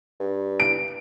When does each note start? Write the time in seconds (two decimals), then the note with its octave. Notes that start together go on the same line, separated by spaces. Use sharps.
0.20 G2
0.60 D7